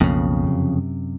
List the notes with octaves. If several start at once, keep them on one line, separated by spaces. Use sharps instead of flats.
B1 F2 C#3 A#3 B3
F#2 C3